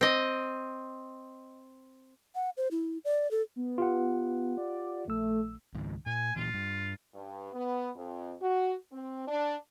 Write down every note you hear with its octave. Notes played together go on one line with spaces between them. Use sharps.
C4 D#5
F#5
C5
E4
D5
A4
B3
F4 G4 F#5
D5
A#1 A3 E6
C#2 G#2 D#3
A#2 G#5
A#2 E3 F4
G2
G2
B3
F2
F#4
C4
D4